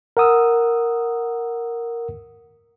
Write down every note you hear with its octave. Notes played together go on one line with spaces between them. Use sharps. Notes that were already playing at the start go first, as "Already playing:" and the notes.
A#4 F#5 D#6 E6